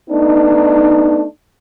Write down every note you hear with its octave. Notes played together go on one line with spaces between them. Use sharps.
A3 B3 D4 D#4